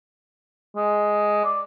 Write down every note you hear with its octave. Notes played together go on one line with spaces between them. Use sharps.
G#3
D5